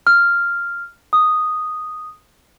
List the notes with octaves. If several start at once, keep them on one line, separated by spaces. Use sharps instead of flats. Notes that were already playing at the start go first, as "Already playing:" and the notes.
F6
D#6